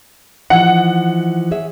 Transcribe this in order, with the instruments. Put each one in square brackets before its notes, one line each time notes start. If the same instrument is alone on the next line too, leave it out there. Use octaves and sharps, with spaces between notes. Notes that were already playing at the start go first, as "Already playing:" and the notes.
[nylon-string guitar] E3 F3 D#4 [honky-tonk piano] F#5
[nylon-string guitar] G#4 C#5 E5